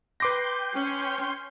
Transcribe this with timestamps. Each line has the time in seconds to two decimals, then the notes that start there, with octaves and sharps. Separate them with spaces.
0.20 B4 G5 C6 D6 A#6
0.75 C#4 C#5